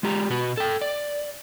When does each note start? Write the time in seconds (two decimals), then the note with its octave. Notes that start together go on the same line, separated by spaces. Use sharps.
0.03 G#3 F4 G4 A#5
0.30 B2 F#4 B4
0.57 A4 G5
0.81 D5